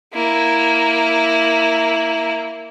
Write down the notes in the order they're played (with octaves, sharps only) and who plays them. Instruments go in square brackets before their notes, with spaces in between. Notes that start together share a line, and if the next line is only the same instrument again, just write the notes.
[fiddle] A#3 E4